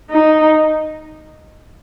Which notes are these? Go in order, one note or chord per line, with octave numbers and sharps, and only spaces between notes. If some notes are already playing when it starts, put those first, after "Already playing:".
D#4